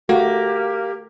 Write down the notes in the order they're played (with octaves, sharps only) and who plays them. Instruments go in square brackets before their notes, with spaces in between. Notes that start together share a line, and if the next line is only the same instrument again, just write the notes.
[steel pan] A3 F#4 [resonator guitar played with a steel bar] A#3 [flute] G4